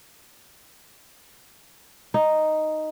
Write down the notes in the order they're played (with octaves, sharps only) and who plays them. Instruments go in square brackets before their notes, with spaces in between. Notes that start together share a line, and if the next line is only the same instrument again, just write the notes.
[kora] D#4